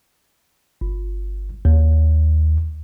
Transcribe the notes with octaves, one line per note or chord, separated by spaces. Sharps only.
G1
D#2